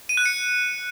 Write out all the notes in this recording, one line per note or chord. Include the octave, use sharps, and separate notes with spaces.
D#7
F#6
C#7